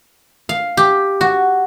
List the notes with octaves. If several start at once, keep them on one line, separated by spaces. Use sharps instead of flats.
F5
G4
F#4